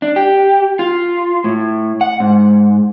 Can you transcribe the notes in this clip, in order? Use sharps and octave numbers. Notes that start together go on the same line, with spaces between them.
D4
G4
F4
A2
F#5
G#2